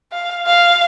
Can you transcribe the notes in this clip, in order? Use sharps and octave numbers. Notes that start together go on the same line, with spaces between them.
F5
F5